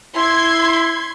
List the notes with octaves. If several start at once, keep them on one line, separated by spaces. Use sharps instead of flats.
E4 C6 G#6